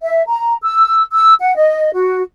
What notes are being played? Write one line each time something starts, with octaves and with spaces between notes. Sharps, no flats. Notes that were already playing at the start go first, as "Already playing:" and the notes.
E5
A#5
E6
E6
F#5
D#5
F#4